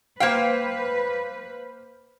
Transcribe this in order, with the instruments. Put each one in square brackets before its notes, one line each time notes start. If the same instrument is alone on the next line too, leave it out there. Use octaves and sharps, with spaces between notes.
[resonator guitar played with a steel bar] A#3 G5 [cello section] B4 [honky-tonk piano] C5 F5